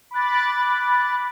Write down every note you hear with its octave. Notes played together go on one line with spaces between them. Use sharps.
B5 D6 F#6 A6